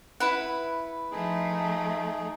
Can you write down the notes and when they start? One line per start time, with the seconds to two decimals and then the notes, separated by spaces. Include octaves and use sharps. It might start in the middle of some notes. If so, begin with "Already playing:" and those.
0.20 E4 B4 F#5
1.12 F3 A3 D#4 G#4